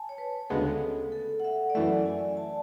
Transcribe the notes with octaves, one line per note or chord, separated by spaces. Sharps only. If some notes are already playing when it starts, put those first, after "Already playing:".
Already playing: G#5 A5
C#5
B4
D2 C#3 G#3 B3 A4
A4
F#5
E5
D5
F#2 E3 A3 E5
G#5
A5